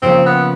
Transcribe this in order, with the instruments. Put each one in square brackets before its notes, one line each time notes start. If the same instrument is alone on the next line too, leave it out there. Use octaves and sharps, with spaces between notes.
[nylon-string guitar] C#3 F3 A#3 [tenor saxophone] C4
[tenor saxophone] B3